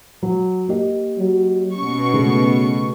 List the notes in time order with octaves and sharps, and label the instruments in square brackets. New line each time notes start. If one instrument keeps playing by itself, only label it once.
[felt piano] F#3
A#3 G4 D#5
[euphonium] F#3
[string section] B2 C#6 [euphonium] C#4
[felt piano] C#3 A3